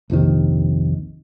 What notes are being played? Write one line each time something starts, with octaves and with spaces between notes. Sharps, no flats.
A#1 F2 C3 D#3